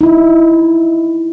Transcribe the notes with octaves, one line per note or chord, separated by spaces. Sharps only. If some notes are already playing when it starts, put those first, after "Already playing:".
D#4 E4